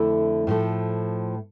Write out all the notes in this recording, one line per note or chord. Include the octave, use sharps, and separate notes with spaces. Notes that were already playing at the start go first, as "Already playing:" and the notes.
Already playing: F2 D3 A3 E4
A2 F3 A3